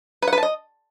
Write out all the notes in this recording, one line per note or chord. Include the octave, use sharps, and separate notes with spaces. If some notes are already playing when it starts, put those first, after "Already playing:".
B4
F#5
B4
A5
D#5